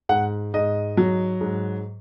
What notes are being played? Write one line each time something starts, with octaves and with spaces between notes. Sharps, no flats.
G#2 F#5
G#2 D#5
F#3
G#2